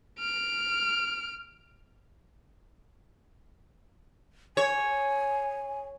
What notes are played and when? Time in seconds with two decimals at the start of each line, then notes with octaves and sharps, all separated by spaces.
0.19 F6 D7
4.57 C#5 G#5